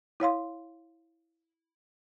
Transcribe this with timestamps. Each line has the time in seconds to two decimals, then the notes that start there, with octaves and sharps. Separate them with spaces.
0.20 E4 C#5 F5 C6